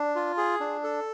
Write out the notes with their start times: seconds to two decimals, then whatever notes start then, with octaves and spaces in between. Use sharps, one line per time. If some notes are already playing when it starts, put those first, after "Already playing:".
Already playing: D4
0.15 F4
0.37 G#4
0.60 D4
0.83 A4